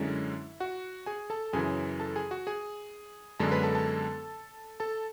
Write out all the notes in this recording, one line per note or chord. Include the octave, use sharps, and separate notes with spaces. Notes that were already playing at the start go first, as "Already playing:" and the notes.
Already playing: F#2 D3 G#3 C#4 E4
F#4 F#5
G#4 G#5
A4 A5
F#2 C#3 E3 G#4 G#5
A4 A5
G#4 G#5
F#4 F#5
G#4 G#5
F#2 D3 G#3 B3 D4 A4 A5
B4 B5
A4 A5
A4 A5
A4 A5